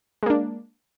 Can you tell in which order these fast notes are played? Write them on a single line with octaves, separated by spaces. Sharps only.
G#3 A#3 D4